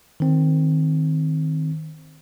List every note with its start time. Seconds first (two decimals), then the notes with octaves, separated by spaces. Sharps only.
0.20 D#3 C4